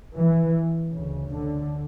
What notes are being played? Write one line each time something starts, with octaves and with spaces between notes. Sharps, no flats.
E3
D2 C#3
D3